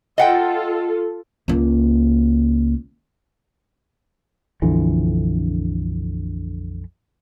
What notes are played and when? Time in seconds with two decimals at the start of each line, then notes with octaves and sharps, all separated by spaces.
0.18 F4 A4 D#5 F#5 G5
1.48 C#2 A#3
4.62 A#1 F2 D3 E3